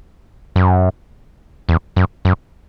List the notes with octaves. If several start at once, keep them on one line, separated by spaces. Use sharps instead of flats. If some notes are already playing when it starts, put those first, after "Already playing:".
F#2
E2
F#2
F#2